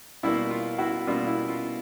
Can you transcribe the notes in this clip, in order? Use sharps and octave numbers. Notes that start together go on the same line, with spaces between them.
B2 G3 A#3 E4
F4
E4 F#4
B2 G3 A#3 F4
E4
F4